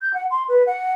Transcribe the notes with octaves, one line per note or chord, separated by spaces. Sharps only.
G6
F#5
C6
B4
F#5